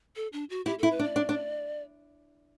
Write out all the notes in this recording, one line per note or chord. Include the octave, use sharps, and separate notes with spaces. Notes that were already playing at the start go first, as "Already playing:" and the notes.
A4
D4
F#4
E4 G4
A4
E4
B4
D4
D5
D4
D4